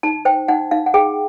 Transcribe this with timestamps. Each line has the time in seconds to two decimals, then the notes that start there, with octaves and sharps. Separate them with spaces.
0.03 D#4 A5
0.25 C5 G5
0.48 D#4 F#5
0.71 D#4 F5
0.86 F#5
0.94 G#4 G5